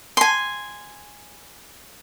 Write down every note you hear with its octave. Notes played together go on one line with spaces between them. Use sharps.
G#5 C6